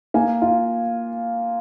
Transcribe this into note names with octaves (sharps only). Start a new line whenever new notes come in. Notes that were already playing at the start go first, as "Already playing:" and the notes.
A#3 G#5
F4